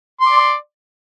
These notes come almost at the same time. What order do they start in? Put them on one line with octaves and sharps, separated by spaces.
C6 D6 D5